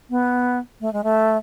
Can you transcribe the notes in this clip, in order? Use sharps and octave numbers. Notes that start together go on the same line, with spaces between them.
B3
A3
G#3
A3